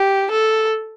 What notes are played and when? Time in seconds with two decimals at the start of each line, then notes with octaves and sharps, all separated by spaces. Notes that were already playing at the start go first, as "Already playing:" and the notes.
Already playing: G4
0.31 A4